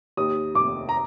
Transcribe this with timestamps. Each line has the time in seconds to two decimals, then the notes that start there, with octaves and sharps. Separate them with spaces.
0.17 D#2 D#6
0.55 F1 D6
0.89 A#5